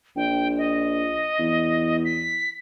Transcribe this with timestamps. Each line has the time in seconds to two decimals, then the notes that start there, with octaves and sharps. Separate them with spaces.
0.16 A#1 G5
0.58 D#5
1.39 E2
2.05 B6